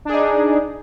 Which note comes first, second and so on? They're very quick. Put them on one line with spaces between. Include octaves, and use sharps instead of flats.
D4 G#4 D#4